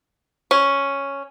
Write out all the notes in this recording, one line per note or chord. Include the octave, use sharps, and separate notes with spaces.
C#4